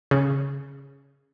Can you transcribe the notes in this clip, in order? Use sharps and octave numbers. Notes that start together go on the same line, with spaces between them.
C#3